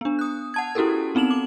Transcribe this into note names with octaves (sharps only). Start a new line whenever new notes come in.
B3 D4
D#6 F#6
F#5 A5 G#6
C#4 E4 F#4 G4 A4 A#4
B3 C4 D#4 E7 F#7
D6